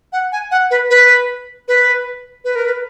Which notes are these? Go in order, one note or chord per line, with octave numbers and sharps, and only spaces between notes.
F#5
G#5
F#5
B4
B4
B4
B4
A#4
B4